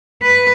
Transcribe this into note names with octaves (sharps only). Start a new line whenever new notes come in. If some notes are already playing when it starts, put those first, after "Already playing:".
B4